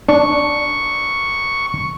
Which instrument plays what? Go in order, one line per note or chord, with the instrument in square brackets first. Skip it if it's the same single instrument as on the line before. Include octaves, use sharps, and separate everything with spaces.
[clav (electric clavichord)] D4 [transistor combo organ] C#6